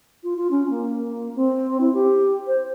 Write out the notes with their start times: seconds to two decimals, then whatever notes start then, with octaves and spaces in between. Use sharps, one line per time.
0.24 F4
0.37 F4
0.51 C#4
0.70 A#3
1.35 C4
1.80 E4
1.94 G4
2.47 C5